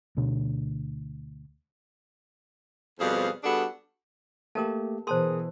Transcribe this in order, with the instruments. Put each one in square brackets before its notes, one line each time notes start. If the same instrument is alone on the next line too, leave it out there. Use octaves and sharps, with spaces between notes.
[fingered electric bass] D2 B2 D4
[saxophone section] F2 B2 G3 G#4 C5 F5
G3 B3 D4 F#4 G#4 A4
[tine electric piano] A3 A#3 G4 [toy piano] A#4 A5
[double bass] B2 E3 [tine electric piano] G#4 A#4 D#6 [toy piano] C5 A5 C6